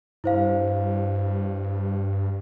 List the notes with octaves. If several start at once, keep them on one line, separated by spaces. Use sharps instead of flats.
G2 E4 C5 F5